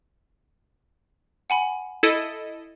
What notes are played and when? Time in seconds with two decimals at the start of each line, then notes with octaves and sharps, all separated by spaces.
1.50 F#5 G#5 B5
2.03 E4 A4 D#5